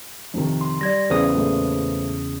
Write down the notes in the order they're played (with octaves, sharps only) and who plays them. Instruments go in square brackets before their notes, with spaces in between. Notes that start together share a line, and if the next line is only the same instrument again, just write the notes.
[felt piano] F2 C3 D#3
[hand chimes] C6
[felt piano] G3 [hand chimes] D5 G#6 A#6
[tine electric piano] E2 C#3 D#6 [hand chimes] B4 C5
[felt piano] A#2 A3